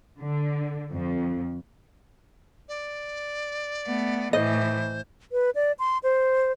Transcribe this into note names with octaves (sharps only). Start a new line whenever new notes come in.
D3
F2
D5
A3 B3
A2 E3 C5 D#5
B4
D5
C6
C5